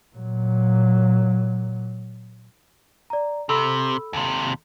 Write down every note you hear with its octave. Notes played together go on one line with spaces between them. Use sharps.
A#2 F#3
D5 A#5
C3 A4 B5 E6
D#2 C3